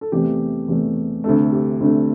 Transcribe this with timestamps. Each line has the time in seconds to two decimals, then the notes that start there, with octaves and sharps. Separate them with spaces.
0.01 A4
0.12 E2 C3 A3 G4
0.68 E2 C3 A3
1.24 D2 C3 A3 A4
1.52 G4
1.80 D2 C3 A3 D4